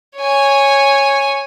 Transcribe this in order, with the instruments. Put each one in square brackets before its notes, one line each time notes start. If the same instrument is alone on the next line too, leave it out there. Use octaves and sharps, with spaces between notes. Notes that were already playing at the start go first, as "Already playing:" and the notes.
[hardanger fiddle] C#5 G#5